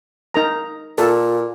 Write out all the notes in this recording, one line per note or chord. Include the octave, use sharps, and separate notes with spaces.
D#4 A#4 A#5
A#2 F4 A4